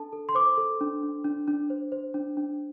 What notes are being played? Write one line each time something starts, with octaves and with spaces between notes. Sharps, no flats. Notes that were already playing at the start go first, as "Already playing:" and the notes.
Already playing: D4 A4 A5
A4
C6
C5 D6
A4
D4
D4
D4
D4
C5
C5
D4
D4